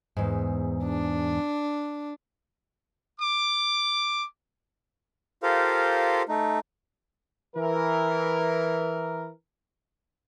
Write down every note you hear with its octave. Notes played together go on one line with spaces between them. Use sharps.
E2 G#2
D4
D6
F4 G4 A4 A#4 C5 F5
A3 D#4
E3 A#4